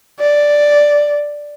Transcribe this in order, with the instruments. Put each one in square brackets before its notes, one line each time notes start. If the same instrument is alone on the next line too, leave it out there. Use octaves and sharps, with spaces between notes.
[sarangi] D5